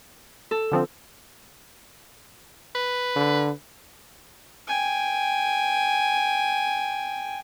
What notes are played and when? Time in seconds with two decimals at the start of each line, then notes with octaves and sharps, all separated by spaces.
0.51 A4
0.71 D3 F3 C4
2.75 B4
3.16 D3
4.67 G5 G#5